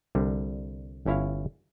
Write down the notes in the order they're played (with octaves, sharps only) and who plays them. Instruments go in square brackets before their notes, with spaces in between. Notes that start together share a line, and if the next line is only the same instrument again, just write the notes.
[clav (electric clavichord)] C2 D3 G3
G1 C#4 E4 C#5 F5